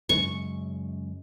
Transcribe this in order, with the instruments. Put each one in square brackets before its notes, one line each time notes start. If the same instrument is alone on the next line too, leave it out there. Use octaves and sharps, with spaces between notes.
[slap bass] F#2 C#3 G#3 [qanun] C#6